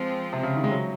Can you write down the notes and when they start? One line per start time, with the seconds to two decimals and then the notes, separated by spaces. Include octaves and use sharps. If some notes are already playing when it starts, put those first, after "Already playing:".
Already playing: F3 G#3 C4 F4
0.33 C3
0.43 C#3
0.57 D#3
0.64 G#3
0.71 F#3